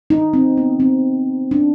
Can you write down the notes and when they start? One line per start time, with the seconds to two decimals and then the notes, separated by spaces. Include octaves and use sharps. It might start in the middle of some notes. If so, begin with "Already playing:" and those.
0.10 D#4
0.33 C4
0.57 B3
0.80 C4
1.51 D4